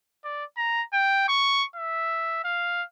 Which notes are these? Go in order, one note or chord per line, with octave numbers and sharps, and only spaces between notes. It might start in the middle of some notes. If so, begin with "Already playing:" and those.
D5
A#5
G5
C#6
E5
F5